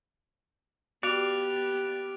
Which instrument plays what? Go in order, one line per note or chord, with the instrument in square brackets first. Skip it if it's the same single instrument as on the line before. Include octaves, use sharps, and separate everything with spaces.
[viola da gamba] B3 G4 [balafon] F#4 [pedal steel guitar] D5 F5 [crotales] F#6 D7 F7